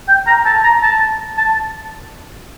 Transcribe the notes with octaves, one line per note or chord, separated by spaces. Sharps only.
G5
A#5
A5
A#5
A5
A5